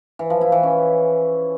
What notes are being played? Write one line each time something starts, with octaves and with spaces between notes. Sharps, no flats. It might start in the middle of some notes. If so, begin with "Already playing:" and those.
E3
F3
E4
E3
C#4